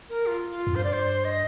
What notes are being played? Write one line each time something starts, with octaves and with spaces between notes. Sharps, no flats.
A#4
F4
F4
F2
G2 C5
D5
C5
D#5